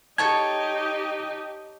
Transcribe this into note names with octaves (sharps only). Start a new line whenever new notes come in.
D#4 G4 A4 C#5 A5 G#6